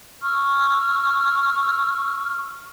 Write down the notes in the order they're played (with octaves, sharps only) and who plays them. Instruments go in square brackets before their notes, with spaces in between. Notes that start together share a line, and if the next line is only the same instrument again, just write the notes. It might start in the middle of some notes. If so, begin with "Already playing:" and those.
[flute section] C#6 E6 F6